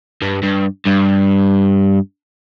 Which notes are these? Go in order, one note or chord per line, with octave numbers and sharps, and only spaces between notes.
G2
G2
G2